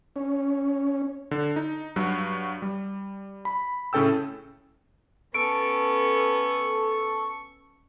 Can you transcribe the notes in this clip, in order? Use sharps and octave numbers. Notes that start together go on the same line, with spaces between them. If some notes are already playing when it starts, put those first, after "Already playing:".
C#4
D3
D#4
G2 F#3 F#4
G3
B5
A2 C#3 C#4 A4 G5 E6
B3 C#4 A4 C#6 D7